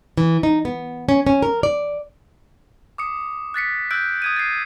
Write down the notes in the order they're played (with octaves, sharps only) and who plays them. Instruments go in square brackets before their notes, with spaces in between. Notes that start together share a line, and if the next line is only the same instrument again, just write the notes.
[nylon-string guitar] E3
D#4
B3
C#4
C#4
A#4
D5
[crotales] D6 D#6 C#7
F#6 A6 B6 C#7
E6 F#6 G6 D7
D#6 G#6 D#7
A6 C7